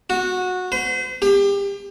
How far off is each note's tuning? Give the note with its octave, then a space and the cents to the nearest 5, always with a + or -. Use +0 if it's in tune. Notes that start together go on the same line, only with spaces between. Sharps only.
F#4 -15
C5 -40
G4 +30